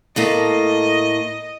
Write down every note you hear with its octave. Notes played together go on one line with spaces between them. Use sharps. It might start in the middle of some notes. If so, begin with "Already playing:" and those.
A2 A3 A#3 D#5